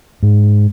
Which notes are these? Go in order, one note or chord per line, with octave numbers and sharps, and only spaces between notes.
G#2